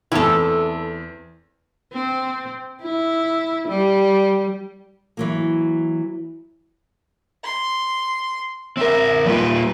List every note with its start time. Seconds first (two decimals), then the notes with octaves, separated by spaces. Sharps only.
0.12 E2 C4 E4 A4
1.93 C4
2.82 E4
3.69 G3
5.17 E3 F#3 A#3
7.44 C6
8.77 C4 A#4 E5
9.26 G3 A#3 F4 B4